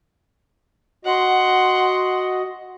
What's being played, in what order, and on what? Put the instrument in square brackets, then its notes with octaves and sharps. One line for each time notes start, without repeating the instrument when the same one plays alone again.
[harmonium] F#4 D#5 [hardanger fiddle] F#5 C6